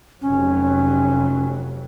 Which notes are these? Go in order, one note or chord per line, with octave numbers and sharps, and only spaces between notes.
F1 F2 F#3 C#4